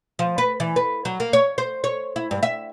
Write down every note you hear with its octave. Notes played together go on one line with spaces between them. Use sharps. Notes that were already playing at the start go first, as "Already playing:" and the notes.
F3
B4
E3
B4
F#3
A#3
C#5
C5
C#5
E4
G2
E5